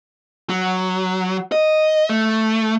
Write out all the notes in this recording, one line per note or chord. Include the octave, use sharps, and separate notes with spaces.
F#3
D#5
A3